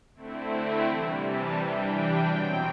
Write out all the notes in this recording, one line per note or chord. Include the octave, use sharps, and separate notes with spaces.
D3 A3 C4 E4
C3 E3 G3
A5
E3 G3 D4 G5
B2 F#3 C4 G5